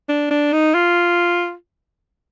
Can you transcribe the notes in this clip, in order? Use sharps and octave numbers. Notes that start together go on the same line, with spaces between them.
D4
D4
D#4
F4